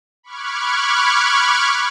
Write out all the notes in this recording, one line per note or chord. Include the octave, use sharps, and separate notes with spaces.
B5 C#6 D6 F6 F#6 G#6